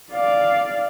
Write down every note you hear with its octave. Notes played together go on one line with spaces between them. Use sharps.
D5 F5